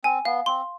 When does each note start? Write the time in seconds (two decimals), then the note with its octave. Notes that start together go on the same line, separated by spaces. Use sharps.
0.04 C4 G#5
0.25 B3 F5
0.46 C4 C6